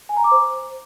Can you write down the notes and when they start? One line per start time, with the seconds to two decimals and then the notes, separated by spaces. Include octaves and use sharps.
0.09 G#5
0.17 A#5
0.24 D6
0.32 C5